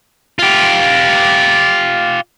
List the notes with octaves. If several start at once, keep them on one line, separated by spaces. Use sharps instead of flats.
F4 G4